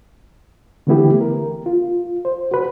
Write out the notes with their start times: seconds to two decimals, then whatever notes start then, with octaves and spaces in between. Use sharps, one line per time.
0.87 D3 E3 A3 B3 E4 G4
1.21 A#4
1.66 F4
2.25 C5
2.51 F#4 B4